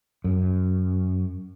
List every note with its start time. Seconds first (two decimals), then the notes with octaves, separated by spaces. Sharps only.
0.24 F#2